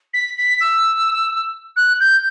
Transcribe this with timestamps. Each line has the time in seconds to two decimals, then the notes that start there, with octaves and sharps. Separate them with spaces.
0.13 B6
0.37 B6
0.60 E6
1.76 F#6
2.00 G6